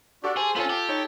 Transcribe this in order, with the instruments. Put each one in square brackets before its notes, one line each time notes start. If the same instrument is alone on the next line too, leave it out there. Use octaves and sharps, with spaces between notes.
[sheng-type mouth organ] D4 F#4 D5 [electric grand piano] G4 A4 C#6
[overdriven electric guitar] G#4 [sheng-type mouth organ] C5
[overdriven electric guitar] B3 C#4 [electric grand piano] F4 C5 [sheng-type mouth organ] A4
[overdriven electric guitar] G4
[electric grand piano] D#4 C#5